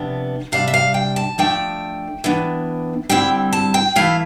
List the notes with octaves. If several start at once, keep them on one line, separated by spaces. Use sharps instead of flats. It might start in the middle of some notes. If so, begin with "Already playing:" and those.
Already playing: C3 F3 B3 D4
C3 G3 D4 F5
E5
F5
G5
A5
F3 A3 D4 G5
E3 B3 D4
D3 G3 C4 E4 G5
A5
G5
E3 A3 E4 F5